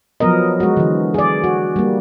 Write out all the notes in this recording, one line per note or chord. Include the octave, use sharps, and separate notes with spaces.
F3 F#3 B3 A#4 D#5
G#3 F#4
D3 E3
G#4 D5
F#4
G3 A#3